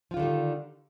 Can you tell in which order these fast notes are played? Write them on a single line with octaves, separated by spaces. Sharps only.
F3 F4 D3 D#3 G3